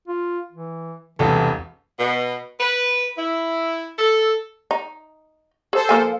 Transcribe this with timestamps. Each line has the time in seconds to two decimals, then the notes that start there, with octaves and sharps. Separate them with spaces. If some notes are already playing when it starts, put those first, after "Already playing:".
0.08 F4
0.52 E3
1.19 E1 C2 E3 A4
1.99 B2
2.60 B4
3.18 E4
3.98 A4
4.71 D#4
5.73 G#4 A4 C5
5.89 F3 A#3 G#5